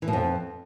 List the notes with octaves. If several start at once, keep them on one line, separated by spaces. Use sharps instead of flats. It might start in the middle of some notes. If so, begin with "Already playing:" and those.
E3
B2
F2